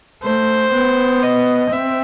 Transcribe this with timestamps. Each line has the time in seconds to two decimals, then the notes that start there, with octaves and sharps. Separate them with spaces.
0.23 A3 C5
0.72 B3
1.23 D#5
1.72 C4 E5